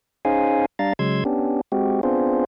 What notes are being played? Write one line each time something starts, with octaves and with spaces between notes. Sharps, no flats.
C#4 D#4 G#4 C5 F5 G#5
G3 D4 F5 A#5 A6
C#3 F#3 G#3 C6 E6 G#6
B3 C#4 D4 G4
G#3 C4 F#4 G4
B3 C4 D4 F4 G#4 C5